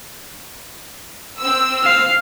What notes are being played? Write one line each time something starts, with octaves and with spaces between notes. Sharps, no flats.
C4 E6
F5